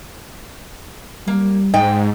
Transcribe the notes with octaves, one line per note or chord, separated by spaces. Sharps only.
G3 A#3
G#2 D#5 G5